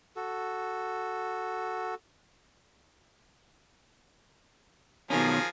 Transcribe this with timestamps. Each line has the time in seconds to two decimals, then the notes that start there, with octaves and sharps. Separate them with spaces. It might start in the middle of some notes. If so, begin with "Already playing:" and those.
0.16 F#4 A4
5.10 B2 D#3 F3 C#4 G#4 A#4